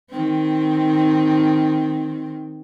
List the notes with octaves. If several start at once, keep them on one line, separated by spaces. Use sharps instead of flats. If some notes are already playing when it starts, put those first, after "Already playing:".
D#3 C4